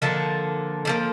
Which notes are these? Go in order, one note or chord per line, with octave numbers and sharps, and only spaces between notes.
D3 F3 A#3 A4
D3 F3 A#3